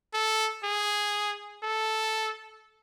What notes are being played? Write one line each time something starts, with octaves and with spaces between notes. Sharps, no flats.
A4
G#4
A4